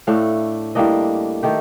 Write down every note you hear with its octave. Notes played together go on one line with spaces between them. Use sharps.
A2 A3 D4 F5
A2 G3 A#3 D4 D#5
D#3 A3 G4